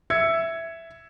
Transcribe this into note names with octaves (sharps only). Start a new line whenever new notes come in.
E5 E6 G#6 C#7